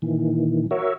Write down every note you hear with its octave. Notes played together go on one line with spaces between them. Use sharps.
A#2 D#3 E3
F#4 A#4 C#5 E5